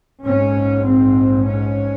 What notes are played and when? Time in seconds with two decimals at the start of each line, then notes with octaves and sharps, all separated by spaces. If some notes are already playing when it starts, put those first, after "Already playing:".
0.25 A#1 G#2 C#4
0.86 C4
1.47 C#4